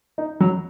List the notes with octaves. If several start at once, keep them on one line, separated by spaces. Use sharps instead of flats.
D#4
F#3